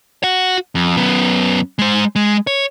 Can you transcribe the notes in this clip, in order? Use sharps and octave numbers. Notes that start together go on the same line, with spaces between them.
F#4 F#5
F2
F#2 B3
G#3 C5
G#3
C#5